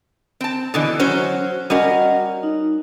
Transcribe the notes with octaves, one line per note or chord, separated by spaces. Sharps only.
C4 A5
B2 D3 E3
F#3 C#4 C5
G3 C#4 F#4 A#4 D#5 F#5
D#4